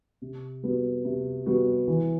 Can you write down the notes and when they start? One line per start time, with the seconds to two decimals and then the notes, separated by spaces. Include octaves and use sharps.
0.22 C3
0.63 G3 B3 F#4
1.05 C3
1.46 G3 B3 F#4
1.88 E3